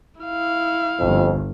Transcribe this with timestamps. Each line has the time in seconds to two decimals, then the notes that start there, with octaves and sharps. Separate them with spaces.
0.21 E4 F5
0.99 G1 F2